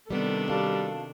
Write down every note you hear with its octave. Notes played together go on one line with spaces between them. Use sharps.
C3 D#3 G3 B3 D4 A4
G3 F#4 F5 A5